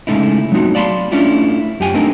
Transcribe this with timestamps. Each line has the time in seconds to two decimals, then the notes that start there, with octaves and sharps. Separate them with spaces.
0.07 C#3 G#3 A3 D#4 E4
0.52 F#3 A3 B3 C4 D#4 F#4
0.75 D5 F5 A5 B5 C6
1.12 A3 C#4 D4 E4 F4
1.80 F#2 G4 G5 G#5
1.94 A3 C4 D4 D#4 A#4